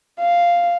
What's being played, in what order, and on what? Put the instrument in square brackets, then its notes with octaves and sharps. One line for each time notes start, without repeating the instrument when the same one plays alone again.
[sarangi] F5